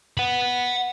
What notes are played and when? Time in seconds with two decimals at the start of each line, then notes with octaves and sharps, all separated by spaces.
0.18 F#5 B5